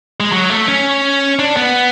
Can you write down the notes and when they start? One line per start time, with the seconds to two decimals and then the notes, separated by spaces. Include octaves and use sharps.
0.20 G#3
0.32 F#3
0.50 A3
0.68 C#4
1.39 D4
1.57 B3